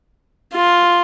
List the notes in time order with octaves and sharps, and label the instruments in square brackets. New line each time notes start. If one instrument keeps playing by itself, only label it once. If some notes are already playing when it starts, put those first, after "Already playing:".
[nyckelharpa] F4